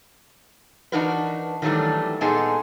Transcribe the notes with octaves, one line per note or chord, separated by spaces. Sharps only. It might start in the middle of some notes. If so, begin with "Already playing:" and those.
E3 D4 D#4 F#4 A#4 B4
D#3 E3 F#3 G3 A3 D4
A#2 G#3 B3 D#4 G#4 A4